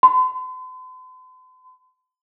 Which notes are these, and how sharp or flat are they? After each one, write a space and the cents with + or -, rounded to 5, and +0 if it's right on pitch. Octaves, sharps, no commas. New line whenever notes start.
C6 -45